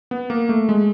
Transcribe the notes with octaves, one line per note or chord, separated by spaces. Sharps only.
B3
A#3
A3
G#3